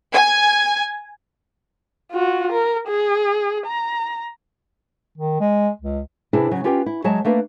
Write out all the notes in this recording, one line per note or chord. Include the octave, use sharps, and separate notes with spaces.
G#5
F4 F#4
A#4
G#4
A#5
D#3
G#3
C#2
C3 D4 E4 G#4 B4
C#3 F#3 C#4
C#4 F4 G4 B4 F#5 G5
E4
F#3 G#3 C#5 E5 A5
A3 A#3 D4 B4